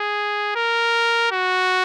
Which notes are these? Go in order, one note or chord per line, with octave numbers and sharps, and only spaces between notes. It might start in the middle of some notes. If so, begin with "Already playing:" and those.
Already playing: G#4
A#4
F#4